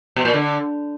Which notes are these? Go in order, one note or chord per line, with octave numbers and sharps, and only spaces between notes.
B2
A#2
D3